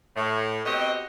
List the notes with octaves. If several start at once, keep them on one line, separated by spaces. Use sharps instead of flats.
A2
B2 C4 F#4 G4 D#5